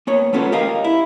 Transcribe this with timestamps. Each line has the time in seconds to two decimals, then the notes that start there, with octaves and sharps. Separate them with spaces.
0.07 A#3 B3 C#5
0.33 A3 B3 C#4 F4 A4
0.52 G4 A#4 D#5 F5
0.84 E4